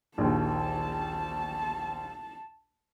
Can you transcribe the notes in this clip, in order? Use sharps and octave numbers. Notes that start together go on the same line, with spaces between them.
A#1 D#2 A5